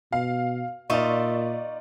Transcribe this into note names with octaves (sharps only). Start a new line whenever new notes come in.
B2 F5
A#2 D#4 F4 D5 E5 C#6